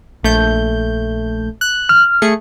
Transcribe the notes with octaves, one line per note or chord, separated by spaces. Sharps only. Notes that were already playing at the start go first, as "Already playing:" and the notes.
A#1 A3 G6
F#6
F6
A3 G#4 C#7